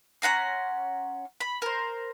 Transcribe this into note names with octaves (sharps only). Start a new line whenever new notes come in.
C#4 F#5 A#5 C6
B5
A#4 C5